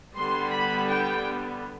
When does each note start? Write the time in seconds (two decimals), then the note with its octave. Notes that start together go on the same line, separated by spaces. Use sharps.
0.15 D3 G3 B3 C6
0.51 B5
0.89 G5